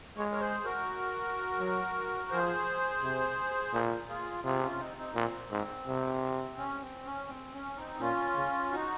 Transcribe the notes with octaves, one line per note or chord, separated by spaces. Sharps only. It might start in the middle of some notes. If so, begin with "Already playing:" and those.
G#3 C#5
A#4 C#5
G#4 C5
F#4 A#4
F#3
F3 G#4 C5
C3
A#2
F4 G#4
C3 F4 G#4
C#4 F4
C4 D#4
C4 D#4
A#2 C4
G#2
C3
C#4
C4
C#4
C4
C#4
C4 D#4
A#2 C#4 F4
C#3
D#4 F#4